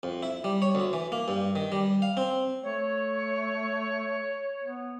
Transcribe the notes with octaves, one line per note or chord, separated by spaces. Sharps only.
F2
E4
G3
C#5
D2
E3
A#3
G2
D#3
G3
F5
C4
A3 C#5
B3